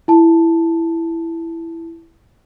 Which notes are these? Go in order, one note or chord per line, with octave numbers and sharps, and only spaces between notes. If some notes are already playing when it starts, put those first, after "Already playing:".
E4 A5